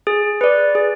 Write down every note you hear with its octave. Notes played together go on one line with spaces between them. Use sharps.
G#4
B4 D5
G#4